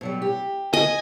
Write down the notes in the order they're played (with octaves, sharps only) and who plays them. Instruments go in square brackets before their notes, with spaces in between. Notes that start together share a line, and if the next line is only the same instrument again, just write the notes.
[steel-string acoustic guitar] B2 F#3 G3
G4
[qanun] D#5 [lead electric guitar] G#5